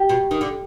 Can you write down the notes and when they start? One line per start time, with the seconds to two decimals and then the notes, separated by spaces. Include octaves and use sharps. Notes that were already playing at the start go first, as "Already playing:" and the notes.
Already playing: G4
0.09 B2
0.31 D#3
0.41 D3